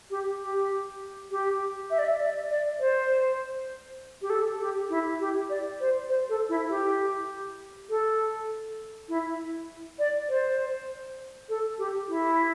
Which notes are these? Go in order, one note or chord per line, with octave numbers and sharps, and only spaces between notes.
G4
G4
G4
E5
D5
E5
D5
D5
C5
G4
A4
G4
E4
G4
D5
C5
C5
A4
E4
G4
A4
E4
D5
C5
A4
G4
E4